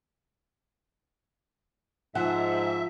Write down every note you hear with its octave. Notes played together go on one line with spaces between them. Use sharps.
G#2 F3 E5 F#5